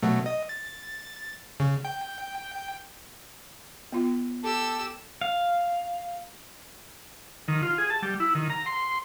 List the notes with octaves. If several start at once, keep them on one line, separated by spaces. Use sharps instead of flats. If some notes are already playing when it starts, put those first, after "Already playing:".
B2 F#3 A3
D#5
A6
C#3
G5
B3 F4
G4 A4 E6
F5
D#3
F4
G#4
A5
G3
E4
D#3
A#5
C6